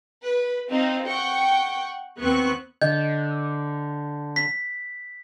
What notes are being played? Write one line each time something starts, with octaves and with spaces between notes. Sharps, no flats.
B4
C4 D#4 F4 C5
F#5 G5 C#6
D#2 B3 C4 C#6 F#6
D3 D#5 G6
B6